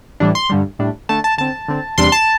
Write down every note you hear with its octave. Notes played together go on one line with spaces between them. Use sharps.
A2 E3 G3 D4
C6
G2 D3 G3
A2 G3 D4
D3 A3 D4 A5
A5
D3 C4 A5
D3 C4
E2 C3 G3 D4 C6
A5